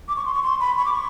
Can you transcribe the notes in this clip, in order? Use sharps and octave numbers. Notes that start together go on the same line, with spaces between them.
D6
C#6
C6
C#6
C6
B5
C#6
D6
C#6